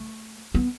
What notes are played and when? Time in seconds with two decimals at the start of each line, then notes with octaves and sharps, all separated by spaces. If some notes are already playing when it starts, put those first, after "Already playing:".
Already playing: A3
0.54 B3